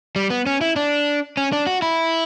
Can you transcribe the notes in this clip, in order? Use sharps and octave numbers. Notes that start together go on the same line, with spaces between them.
G3
B3
C#4
E4
D4
C#4
D4
F#4
E4